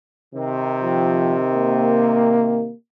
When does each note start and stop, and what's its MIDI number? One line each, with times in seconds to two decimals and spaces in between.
0.34 2.69 48
0.34 2.69 51
0.83 1.39 53
1.56 2.74 58